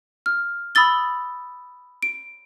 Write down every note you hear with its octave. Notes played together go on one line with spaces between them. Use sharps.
F6
B5 D#6 E6 A6 G7
D7